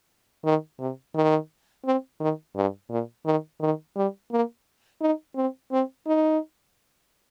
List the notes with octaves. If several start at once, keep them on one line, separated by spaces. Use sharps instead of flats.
D#3
C3
D#3
C4
D#3
G2
A#2
D#3
D#3
G3
A#3
D#4
C4
C4
D#4